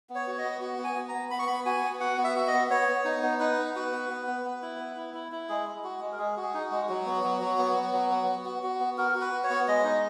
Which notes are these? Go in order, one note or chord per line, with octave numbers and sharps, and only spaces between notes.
B3
C#5
F#4
D#5
B3
F#4
B3
G#5
B3
A#5
B3
B3 B5
C#6
B3 B5
F#4 G#5
B3
F#4 F#5
B3
E5
F#4 E5
D#5
B3
B3 C#5
B3
D#4
B3
D#4 B4
B3
F#4 B4
B3
B3
B3
B3
E4
B3
E4
E4
E4
G#3 G#4
G#3
F#4
G#3
A#4
G#3 G#4
F#4
G#4
D#4
F#4
G#3
F#3 F#4
B3
F#3
F#3
B3
B3
F#3
B3
B3
F#4
F#4
B3
F#4 A#4
F#4
B4
F#4
C#5
B3
G#3 D#5
D#4